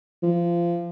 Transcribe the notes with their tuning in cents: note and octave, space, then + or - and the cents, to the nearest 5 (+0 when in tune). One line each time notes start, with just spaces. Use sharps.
F3 -25